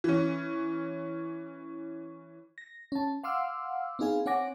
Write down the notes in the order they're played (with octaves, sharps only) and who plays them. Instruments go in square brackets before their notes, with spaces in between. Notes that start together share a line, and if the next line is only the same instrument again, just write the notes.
[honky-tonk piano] E3 C#4
[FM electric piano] A#6
C#4 A5
F5 F#5 C6 D6 E6 F6
B3 C4 D#4 G#4 F5 G#5
C4 C#5 F#5 G#5 D6 A#6